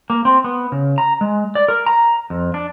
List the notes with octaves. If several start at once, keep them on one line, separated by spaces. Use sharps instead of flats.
A#3
C4
B3
C#3
A#5
G#3
D5
A#4
A#5
F2
D4